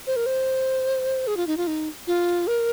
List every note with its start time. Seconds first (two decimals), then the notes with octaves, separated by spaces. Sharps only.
0.07 C5
0.16 A#4
0.26 C5
1.27 G#4
1.37 F4
1.47 D#4
1.57 F4
1.67 D#4
2.07 F4
2.47 A#4